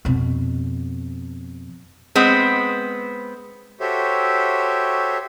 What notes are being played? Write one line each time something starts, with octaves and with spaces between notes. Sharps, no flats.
F2 B2
G#3 B3 C4
F#4 G4 A4 C5 C#5 E5